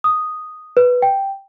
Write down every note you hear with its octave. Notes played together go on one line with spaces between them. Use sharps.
D#6
B4
G5